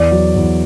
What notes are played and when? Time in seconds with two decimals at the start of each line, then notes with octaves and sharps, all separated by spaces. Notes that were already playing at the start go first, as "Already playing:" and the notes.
Already playing: E2 D5
0.11 F#3
0.36 E2